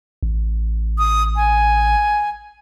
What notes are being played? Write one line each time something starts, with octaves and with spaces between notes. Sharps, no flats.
A1
D#6
G#5